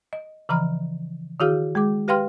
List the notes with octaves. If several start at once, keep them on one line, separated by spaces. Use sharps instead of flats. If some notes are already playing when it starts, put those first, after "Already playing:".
D#5
C#3 E3 F3 A#5 B5 F6
D#3 E4 F#4 G#4 F5 F6
G#3 G#4 D6
G4 B4 F5 G5 C6 F6